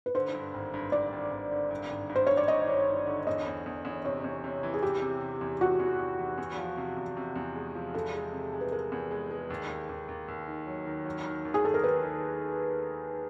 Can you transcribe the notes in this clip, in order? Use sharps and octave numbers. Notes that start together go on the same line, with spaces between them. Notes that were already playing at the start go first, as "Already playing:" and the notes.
B4
D3 C5
G2
G#1
G2
G2 D5
G#1
G#1
D3
G2
G#1
G2
C5
G2 C#5
D5
G#1 D#5
G2
G2
D3
E2 D#5
E2
E2
E2
C3 C#5
E2
C3
E3
G#4
E3 G4
C3
C3
E2
E3 F#4
E2
E2
E3
E2
F3
C3
E2
C3
E2
G#3
F3
E2 A4
G#3
C3
G#3
B4
G#3 A#4
E2
G#3
G#3
D#2
D#2
D#2
D#2
D#2
D#3
F#3
D#3
F#3
D#3
D#2
G#4
D#2 A4
A#4
D#3 B4
D#3